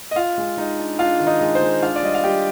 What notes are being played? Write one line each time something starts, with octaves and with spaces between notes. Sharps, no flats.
D#5
F4 F5
G#3
G#3 D#4 D#5
D4
D4 F4 F5
D#3
D#4 D#5
G#3
C5
G#3
D4 F4 F5
D5
G3 D#5
F5
G3 G4 G5